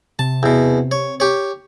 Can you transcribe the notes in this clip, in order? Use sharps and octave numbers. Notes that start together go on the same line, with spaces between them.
C3 A5
E2 B2
C#5
G4 C#5